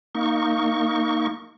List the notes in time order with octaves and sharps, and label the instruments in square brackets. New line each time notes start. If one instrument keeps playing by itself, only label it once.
[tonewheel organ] A#3 D#4 C#6